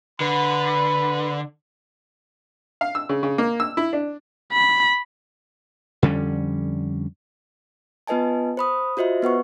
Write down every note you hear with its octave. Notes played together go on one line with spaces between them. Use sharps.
D3 B4 B5
F5
E6
C#3
C#3
A#3
E6
E4
D4
B5
F2 D3 G3 C#4
B3 F4 B4 D#5 G#5 A5
C5 B5 D#6
F4 F#4 C5 D#5 E5
B3 B4 F#5 C#6